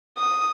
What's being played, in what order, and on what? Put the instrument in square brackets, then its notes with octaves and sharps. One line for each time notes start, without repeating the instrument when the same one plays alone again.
[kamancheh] D#6